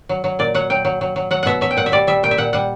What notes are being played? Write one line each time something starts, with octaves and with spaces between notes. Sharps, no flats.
F#3
F#3
A#2 D5
F#3 F#5
F#3 G5
F#3
F#3
F#3
F#3 F#5
B2 E5 F#5
F#3 E5
G5
A#2 F#5
E5
G3 D5
G3 E5
A#2 G5
E5
A#2 F#5
G3 F#5